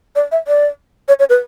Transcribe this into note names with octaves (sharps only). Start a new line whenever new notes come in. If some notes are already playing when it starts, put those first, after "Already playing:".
D5
E5
D5
C#5
C#5
B4